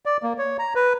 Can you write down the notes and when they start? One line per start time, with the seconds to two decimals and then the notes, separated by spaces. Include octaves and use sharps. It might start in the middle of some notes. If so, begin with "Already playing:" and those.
0.06 D5
0.23 A#3
0.38 C#5
0.59 A#5
0.75 B4